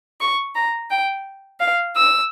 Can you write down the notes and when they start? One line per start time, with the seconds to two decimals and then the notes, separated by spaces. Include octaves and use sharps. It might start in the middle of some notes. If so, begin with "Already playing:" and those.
0.20 C#6
0.55 A#5
0.91 G5
1.60 F5
1.96 E6